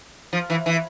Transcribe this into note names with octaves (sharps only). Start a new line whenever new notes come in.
F3
E3
E3